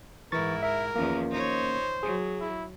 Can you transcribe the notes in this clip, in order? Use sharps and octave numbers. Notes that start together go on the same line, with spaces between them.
G#2 E3 E4 A#4 C#6 A6
A#4 E5
E2 D#3 F3 A#3 C#4
D#4 C5 C#5
F#3 G#4
E4